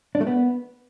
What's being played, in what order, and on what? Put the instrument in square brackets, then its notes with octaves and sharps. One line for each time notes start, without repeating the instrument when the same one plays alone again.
[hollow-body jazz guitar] D4
A3
B3